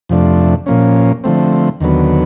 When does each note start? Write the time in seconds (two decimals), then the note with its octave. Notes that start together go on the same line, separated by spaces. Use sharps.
0.09 F2 C3 F3 A3 D4
0.66 A#2 F3 A#3 C#4
1.24 D3 F3 A3 C4
1.80 D#2 D3 F#3 B3